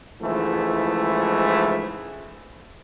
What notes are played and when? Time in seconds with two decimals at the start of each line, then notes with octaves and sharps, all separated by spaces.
0.23 C#2 G#2 E3 F3 A3 E4